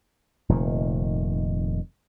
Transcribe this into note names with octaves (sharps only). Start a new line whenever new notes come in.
F1 A#2 D#3